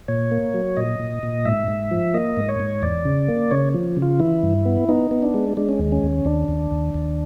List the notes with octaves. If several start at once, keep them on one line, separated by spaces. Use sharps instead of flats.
A#2 C#5
A#3
F#3
A#2 D#5
A#2
A#2
G#2 E5
G#2
F3
A#3 D#5
G#2
C#5
G#2
E2 D5
C#3
A#3
C#3 C#5
F3
C#3
F4
E3 E4
G2
B3
B3 D#4
B3
D4
G#3
G#3 D4
C#4
D#2
C#4
D#2
D#2 D4
D#2
D#2
D#2